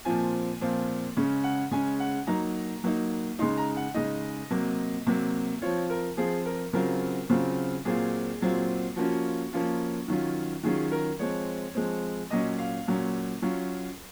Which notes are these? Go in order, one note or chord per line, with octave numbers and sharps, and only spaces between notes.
A#2 F3 C4 F4 G#5
A#2 F3 C4 F4
C#3 G#3 C#4
F#5
C#3 G#3 C#4 G#5
F#5
F#3 A#3 D#4 A#5
F#3 A#3 D#4
C#3 G#3 D#4 C6
A#5
F#5
C#3 G#3 D#4 D#5
C3 F#3 A#3
C3 F#3 A#3
F3 C4 F4 C#5
A#4
F3 C4 F4 G#4
A#4
C#3 F#3 C4 F4 A#4
C#3 F#3 C4 F4
A#2 F#3 C4 F4 G#4
A#2 F#3 C4 F4
F3 A#3 C#4 F4 F#4
F3 A#3 C#4 F4
D#3 F#3 C#4 F4
D#3 F#3 C#4 F4 G#4
A#4
F3 G#3 C4 C#5
F3 G#3 C4
A#2 F#3 C#4 D#5
F5
A#2 F#3 C#4
F#3 C#4 F4